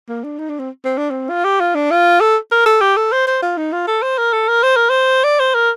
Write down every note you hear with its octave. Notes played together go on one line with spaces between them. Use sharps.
A#3
D4
D#4
D4
C4
C4
D4
C4
F4
G4
F4
D4
F4
A4
A#4
A4
G4
A4
C5
C5
F4
D#4
F4
A4
C5
A#4
A4
A#4
C5
A#4
C5
D5
C5
A#4